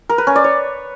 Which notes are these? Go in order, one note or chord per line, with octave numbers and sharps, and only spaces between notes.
A#4
B4
C#4
D5
C#5